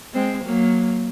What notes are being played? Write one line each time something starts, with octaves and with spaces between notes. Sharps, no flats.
G#3 C4
F#3 A#3